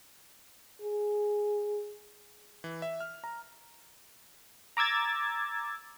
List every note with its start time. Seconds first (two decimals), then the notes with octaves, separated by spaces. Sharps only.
0.82 G#4
2.64 E3
2.82 E5
3.00 F6
3.24 A#5
4.77 A#5 D6 E6 G#6 A6